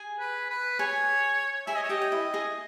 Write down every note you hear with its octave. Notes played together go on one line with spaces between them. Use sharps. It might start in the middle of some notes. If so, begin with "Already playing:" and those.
Already playing: G#4 G#5
B4
B4
G#4 C#5 G#5
G#4 E5 G#5
D#5
C#5
G4 D#5 G5
G5
E4 E5
G#4 G#5